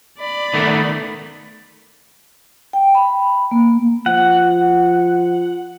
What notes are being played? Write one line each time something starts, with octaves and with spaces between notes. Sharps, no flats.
D5 B5
D#3 A3 B3
G5
B5
A#3
F3 F#5